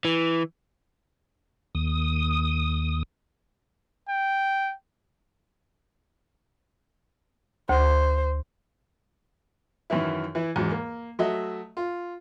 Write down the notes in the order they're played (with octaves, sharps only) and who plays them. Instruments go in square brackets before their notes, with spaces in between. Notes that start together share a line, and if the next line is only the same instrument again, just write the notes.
[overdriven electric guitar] E3
[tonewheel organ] D#2 D#6
[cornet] G5
[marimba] D2 [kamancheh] C5
[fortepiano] F#2 D#3 E3 E4
E3 E4
E2 G#2 F#3
A#3
F#3 A3 D#5 E5 F#5
F4